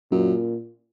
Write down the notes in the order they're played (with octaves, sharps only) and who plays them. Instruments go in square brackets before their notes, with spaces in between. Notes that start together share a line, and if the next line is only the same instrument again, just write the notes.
[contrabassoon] F#2 [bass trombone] A#2